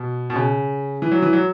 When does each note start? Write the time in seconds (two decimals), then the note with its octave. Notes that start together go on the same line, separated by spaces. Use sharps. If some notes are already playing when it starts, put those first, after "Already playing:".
Already playing: B2
0.30 B2
0.36 C#3
1.02 E3
1.12 F#3
1.22 E3
1.33 F#3